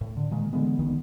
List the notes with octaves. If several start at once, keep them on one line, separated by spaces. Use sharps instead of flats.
A2
D3
A#2 D#3 G#3
D3 E3 G#3 B3
C2 D3 D#3 B3